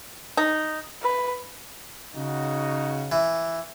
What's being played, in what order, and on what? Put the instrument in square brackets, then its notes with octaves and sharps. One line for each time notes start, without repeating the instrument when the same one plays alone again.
[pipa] D#4
[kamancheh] B4
[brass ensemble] C#3 D#4 F#4
[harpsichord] E3